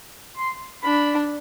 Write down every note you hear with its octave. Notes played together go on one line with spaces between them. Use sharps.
C6
D4 B5